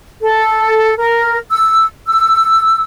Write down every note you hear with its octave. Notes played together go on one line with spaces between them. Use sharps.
A4
A#4
E6
E6